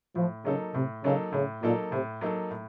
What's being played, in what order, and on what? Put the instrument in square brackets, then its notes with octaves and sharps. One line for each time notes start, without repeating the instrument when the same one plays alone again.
[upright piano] A2 [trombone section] F3
[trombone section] C#3 [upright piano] F#3 A#3 D#4 A4
[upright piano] A2 [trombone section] C3
[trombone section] C#3 [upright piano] F#3 A#3 D#4 A4
[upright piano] A2 [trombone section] C#3
[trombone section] A#2 [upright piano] F#3 A#3 D#4 A4
[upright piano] A2 [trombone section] C3
[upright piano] F#3 A#3 D#4 A4
A2